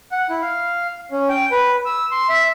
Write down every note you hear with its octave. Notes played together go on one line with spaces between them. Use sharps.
F#5
E4
F5
C#4
G5
B4
E6
C6
E5